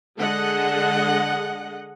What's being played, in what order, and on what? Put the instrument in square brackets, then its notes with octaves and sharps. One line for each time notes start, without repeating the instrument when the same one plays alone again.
[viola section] D3 G#3 G#4 D#5 F#5